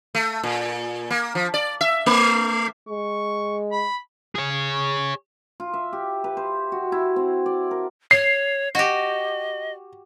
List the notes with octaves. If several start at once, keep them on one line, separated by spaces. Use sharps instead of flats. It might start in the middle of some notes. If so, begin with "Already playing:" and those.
A3
A#2
A#3
F3
D5
E5
A3
G#3 C#6
B5
G#4 C#5
F4
E5
G4
B4
C5
F#4
E4
C4
D5
A#4
C#5 C7
F#4 G4 D#5